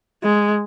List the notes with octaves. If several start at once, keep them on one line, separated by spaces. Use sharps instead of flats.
G#3